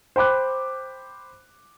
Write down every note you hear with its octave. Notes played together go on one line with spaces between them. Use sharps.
C5 G5 B5 D6 F#6